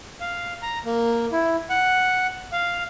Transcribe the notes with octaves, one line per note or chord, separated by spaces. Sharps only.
F5
A#5
A#3
E4
F#5
F5